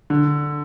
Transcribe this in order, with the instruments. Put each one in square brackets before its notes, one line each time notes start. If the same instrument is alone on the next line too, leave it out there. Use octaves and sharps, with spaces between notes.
[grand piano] D3